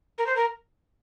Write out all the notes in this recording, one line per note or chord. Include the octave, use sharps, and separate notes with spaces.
A#4
C5
A#4